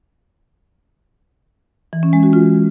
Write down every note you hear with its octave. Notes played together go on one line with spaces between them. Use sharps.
E3
C#4
G#3
F#4
F4